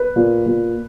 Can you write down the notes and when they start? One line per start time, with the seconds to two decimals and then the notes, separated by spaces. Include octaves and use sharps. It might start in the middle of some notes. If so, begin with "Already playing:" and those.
Already playing: B4
0.16 A#2
0.46 A#2